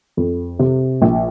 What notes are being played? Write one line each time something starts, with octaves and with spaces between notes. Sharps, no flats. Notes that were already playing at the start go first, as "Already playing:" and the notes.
F2
C3
A#1